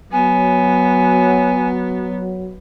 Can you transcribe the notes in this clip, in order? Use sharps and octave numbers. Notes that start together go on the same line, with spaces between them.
F#3 B3 G#5